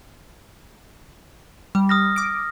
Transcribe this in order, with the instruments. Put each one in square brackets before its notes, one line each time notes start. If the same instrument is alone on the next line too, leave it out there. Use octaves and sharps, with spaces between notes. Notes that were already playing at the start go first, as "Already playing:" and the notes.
[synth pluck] G3
[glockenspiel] D#6 F6 A#6
[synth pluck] D6 D7